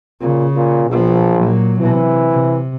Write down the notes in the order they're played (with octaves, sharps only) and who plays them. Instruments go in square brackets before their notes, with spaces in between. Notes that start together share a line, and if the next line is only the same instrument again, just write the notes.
[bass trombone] A#2 [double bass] C#3
[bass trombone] A#2
[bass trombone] A#1 [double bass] B2 F3
[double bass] A#2 F#3
[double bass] C3 [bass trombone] E3
[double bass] C3